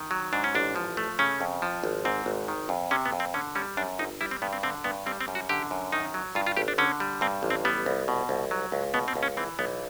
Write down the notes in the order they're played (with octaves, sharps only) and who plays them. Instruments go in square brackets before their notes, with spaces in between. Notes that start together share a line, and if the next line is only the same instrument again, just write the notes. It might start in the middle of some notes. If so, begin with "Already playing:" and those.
Already playing: [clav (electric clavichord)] D#3
F#3
G#2 D4
C#4
A1 D4
F3
A3
C#3 C#4
F2
F3
G#1
G#2 C4
G#1
D#3
F2
C3 C#4
B3
F2
C4
D3 C#4
G3 C#4
F#2 D4
G1 D#4
G3 E4
C4
G2 B3
C4
D3 C4
G2 B3
G3 C4
C4
F#2
F#4
D3 G4
F#2
D#3 D#4
F#3
G2 F4
F4
G#1 G4
D4
D3 C#4
G3
G2 C4
A1
C4
G3 B3
C2
B2
C2
F#3
C#2
B2 B3
C4
C#2
C#4
E3 C4
B1 B3